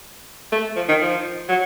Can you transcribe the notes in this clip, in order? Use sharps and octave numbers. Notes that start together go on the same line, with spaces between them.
A3
F3
D#3
F3
F#3